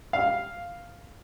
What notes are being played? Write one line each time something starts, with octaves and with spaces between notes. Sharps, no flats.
F5